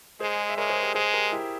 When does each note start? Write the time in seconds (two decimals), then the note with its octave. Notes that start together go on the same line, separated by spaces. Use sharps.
0.20 G#3 G#4 C5
0.49 E5
0.57 G#3 A#4 C#5
0.70 G#4 C5
0.82 G4 A#4
0.95 G#3 G#4 C5
1.13 G4 A#4
1.32 E4 G4